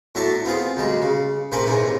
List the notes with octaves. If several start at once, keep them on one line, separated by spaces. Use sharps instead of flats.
A2 F#3 D4 E5 A5 C#6
B3 C4 F4 G#4
D2 G3 G#3
C#3
A#1 C3 A#3 G5 G#5 B5
D#2 G#2 C3 E3